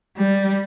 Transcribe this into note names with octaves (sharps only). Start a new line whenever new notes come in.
G3